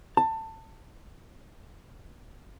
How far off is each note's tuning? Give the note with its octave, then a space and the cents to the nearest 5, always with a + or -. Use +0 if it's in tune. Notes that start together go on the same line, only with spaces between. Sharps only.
A5 +20